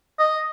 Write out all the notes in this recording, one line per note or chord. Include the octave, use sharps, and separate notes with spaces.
D#5